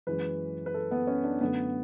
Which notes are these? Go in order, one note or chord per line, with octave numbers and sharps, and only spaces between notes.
F#2 E3 G#3 B4
B4
A4
B3
C#4
D4
F#2 D3 A3 B3